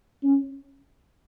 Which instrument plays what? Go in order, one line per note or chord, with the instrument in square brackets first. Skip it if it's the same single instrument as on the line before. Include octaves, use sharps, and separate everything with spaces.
[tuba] C#4